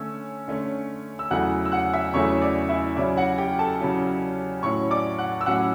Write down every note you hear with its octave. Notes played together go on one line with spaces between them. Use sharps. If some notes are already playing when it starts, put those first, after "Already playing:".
Already playing: D3 A3 C#4 E6
D3 A3 C#4
E6
E2 C#3 F#3 A3 E4 F#5 F#6
E6
F#5 F#6
E5 E6
E2 C#3 F#3 A3 E4 C#5 C#6
D5
E4 E5
C#3 F#3 C#4 E4 D5
F#4 F#5
G4 G5
A4 A5
C#3 F#3 C#4 E4
A2 F#3 C#4 E4 C#5 C#6
D5 D6
F#5 F#6
E6
A2 F#3 C#4 E4 F#5 F#6